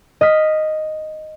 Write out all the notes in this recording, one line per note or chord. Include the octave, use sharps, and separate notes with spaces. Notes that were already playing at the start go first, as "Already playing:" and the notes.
D#5 F6 B6